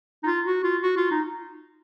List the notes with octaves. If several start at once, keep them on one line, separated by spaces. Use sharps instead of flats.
D#4
F4
F#4
F4
F#4
F4
D#4